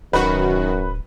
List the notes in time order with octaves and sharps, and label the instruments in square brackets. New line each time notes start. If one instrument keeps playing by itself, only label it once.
[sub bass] D1 [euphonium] F#2 [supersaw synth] D#3 F#4 [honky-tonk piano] B4